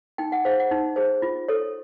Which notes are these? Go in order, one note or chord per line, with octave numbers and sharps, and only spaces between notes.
D#4 G5
F#5
G#4 C5 F5
F#5
D#4
G#4 C5
F4
A4 C#5